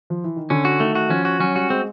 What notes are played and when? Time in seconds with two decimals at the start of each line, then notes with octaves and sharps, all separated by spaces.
0.10 F3
0.24 E3
0.36 D#3
0.50 D3 C#4
0.65 F#4
0.80 D#3 A3
0.95 F#4
1.10 F3 C#4
1.25 F#4
1.40 F#3 C#4
1.55 G3 F#4
1.70 G#3 C4